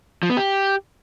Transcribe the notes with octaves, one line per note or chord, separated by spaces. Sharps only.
F3
B3
G4